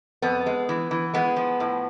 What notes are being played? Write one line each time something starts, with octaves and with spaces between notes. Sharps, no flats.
F2 B3
G#3
E3
E3
G#3 B3
F3
A2